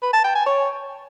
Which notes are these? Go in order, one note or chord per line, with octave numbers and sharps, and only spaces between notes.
B4
A5
G5
G#5
C#5